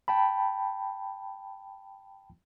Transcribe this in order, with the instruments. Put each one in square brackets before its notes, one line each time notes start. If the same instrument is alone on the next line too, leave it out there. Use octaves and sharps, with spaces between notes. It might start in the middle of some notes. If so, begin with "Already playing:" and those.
[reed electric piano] G5 A5 B5